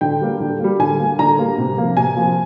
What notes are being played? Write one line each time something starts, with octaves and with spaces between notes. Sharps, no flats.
D3 G5
G3 A#3
D3
G3 A#3
D3 G#5
G3 A#3
D3 A#5
G3 A#3
C3
F3 A#3
C3 G#5
F3 A#3